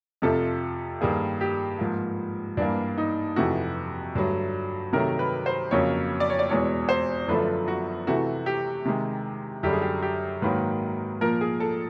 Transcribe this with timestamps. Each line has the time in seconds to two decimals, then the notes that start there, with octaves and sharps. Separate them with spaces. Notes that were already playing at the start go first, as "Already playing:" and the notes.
0.22 F2 C3 F3 A3 A4
1.01 G2 D#3 G3 A#3 G#4
1.41 G4
1.79 G#2 F3 A#3
2.57 G2 E3 G3 A#3 D4
2.98 D#4
3.36 F2 C3 E3 A3 F#4
4.15 G2 D3 F#3 A3
4.93 C3 D#3 F#3 A3 A#4
5.19 B4
5.46 C5
5.71 F2 C#3 F#3 A#3 C#5
6.20 D5
6.30 C#5
6.39 D5
6.49 E2 B2 G#3 C#5
6.89 C5
7.28 F#2 D3 F3 A3 B4
7.68 F#4
8.07 C3 E3 A3 F#4
8.46 G4
8.85 C3 D#3 G#3
9.63 F#2 D3 G3 G4
9.73 G#4
9.82 G4
10.02 G4
10.42 G#2 D#3 F#3 A#3 B4
11.21 A#2 F3 A#3 A#4
11.41 G#4
11.60 A4